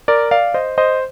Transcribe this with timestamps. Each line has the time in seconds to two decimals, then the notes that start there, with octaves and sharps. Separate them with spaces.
0.08 A#4 D5
0.31 D5 F5
0.54 C5 D#5
0.78 C5 D#5